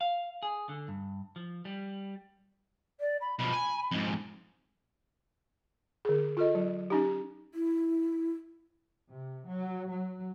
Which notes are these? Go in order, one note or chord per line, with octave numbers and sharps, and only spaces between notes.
F5
G#4
D3
G2
F3
G3
D5
B5
B2 F3 B5
G#5
F2 G#2
D3 G#4
F4 A4 D#5
F#3
C#4 D#4 G4
E4
C3
F#3
F#3